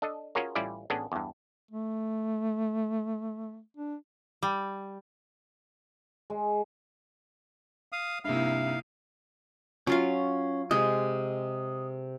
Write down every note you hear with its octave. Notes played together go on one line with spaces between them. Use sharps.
D4 A4 D#5
C#4 F4 F#4 G#4 A#4 C#5
A1 G3 C#4 E4 F4 D5
A1 B3 C#4 D4 G#4
E2 G2
A3
D4
G3
G#3
F5 D#6
G2 C3 A#3 D#4 E4 E5 F5
F#3 C#4 F4 F5
C3 G#3 D#5